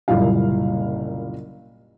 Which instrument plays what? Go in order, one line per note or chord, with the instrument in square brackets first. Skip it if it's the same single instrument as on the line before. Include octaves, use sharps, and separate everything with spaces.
[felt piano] F#1 C2 A#2 G3 E4 F5